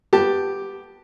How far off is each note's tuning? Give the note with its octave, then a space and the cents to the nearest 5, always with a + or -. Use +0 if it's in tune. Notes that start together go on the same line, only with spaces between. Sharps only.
B3 +0 G4 +0 A5 +5